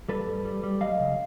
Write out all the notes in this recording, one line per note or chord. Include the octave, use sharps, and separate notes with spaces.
G3 A4 B4
G2
G3
G3
F#3 D#5 F5
C#3